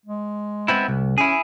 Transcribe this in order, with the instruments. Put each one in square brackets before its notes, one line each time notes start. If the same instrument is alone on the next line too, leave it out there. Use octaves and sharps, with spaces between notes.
[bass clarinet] G#3
[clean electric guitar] B3 C4 E4
C2
[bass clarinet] C#4 [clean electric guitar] E4 G#4